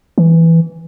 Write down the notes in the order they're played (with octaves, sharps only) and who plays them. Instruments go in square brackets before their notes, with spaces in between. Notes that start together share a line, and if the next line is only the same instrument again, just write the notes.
[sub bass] E3